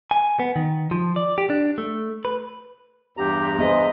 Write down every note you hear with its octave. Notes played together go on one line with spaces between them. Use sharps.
G#5
B3
D#3
F3
D5
G4
D4
A3
B4
E2 G2 G4 A#5
B3 G#4 C5 D#5 E5